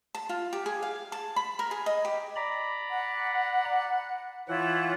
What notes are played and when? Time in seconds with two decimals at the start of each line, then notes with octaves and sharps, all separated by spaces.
0.15 A5
0.29 F4
0.53 G4
0.66 G#4
0.83 F5
1.12 A5
1.36 B5
1.59 A#4
1.71 G#4
1.86 D#5
2.05 G4
2.36 D5 A#5 B5
2.90 F#5
4.48 E3 E4 F4 C#5 F#5